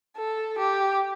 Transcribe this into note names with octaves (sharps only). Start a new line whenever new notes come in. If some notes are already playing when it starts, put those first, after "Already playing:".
A4
G4